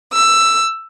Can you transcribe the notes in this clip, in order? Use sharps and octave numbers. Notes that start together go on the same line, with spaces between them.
E6